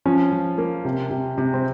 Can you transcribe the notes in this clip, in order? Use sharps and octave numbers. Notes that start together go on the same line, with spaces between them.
F3 C#4
F3
A#3
C3
C3
C3
C4